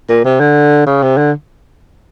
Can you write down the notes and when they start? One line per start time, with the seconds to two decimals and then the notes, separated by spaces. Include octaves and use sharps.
0.09 A#2
0.24 C3
0.40 D3
0.86 C#3
1.03 C3
1.18 D3